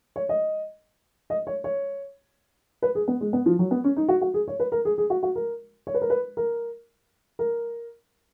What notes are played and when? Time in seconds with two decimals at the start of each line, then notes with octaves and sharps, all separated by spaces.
0.16 C#5
0.29 D#5
1.30 D#5
1.47 C#5
1.64 C#5
2.82 B4
2.95 G#4
3.08 B3
3.21 G#3
3.33 B3
3.46 F3
3.59 F#3
3.71 B3
3.84 C#4
3.96 D#4
4.08 F#4
4.21 F#4
4.34 G#4
4.48 C#5
4.60 B4
4.72 A#4
4.85 G#4
4.98 G#4
5.10 F#4
5.23 F#4
5.36 A#4
5.87 C#5
5.94 B4
6.02 A#4
6.10 B4
6.37 A#4
7.39 A#4